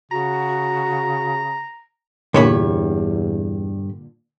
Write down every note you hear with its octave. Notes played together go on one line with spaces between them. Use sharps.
C#3 F#4 A#5
E2 G2 A#2 D3 C#5 B5